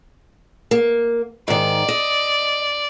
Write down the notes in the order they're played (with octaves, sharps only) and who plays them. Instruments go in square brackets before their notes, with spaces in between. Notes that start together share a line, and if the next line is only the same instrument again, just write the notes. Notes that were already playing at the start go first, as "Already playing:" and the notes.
[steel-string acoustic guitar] A#3
[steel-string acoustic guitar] G#2 D#3 [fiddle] D5
[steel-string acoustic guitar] D#5